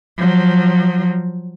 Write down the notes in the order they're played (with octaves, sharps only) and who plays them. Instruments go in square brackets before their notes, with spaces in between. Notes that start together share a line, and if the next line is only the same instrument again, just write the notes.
[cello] F3 F#3